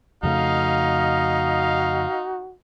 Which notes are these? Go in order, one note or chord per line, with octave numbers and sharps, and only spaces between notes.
F2 C#3 A3 D#4 F#4 D#5 F5